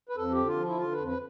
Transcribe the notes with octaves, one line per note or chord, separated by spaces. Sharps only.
B4
F2 A4
D3 G4
F4
F3
E4
D3 F4
F2 B4
B4